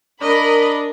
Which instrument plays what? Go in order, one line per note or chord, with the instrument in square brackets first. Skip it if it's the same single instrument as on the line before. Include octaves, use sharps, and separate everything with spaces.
[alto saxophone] D4 [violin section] A#4 B5 [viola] D#5